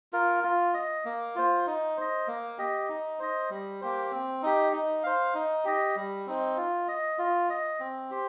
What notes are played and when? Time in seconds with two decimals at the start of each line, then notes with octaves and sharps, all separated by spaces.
0.13 F4 A#4
0.43 F4
0.74 D#5
1.05 A#3
1.36 F4 C5
1.67 D#4
1.97 C5 D#5
2.27 A#3
2.58 G4 D#5
2.89 D#4
3.19 C5 D#5
3.50 G3
3.81 A#3 G4 C5
4.11 C4
4.43 D#4 G4
4.72 D#4
5.03 C5 F5
5.34 D#4
5.65 G4 D#5
5.96 G3
6.26 C4 D#4 C5
6.57 F4
6.88 D#5
7.18 F4
7.50 D#5
7.80 C4
8.10 G4 C5